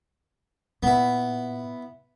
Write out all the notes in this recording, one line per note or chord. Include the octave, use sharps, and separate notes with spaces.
A#2 B3 E4